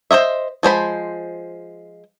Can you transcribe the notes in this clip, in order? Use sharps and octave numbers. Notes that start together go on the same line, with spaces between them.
C5 C#5 D#5 E5
F3 G#3 C5 B5